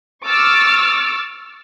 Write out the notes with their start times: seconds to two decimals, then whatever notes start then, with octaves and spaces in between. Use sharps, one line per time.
0.25 C#6 D6 E6 F6 A6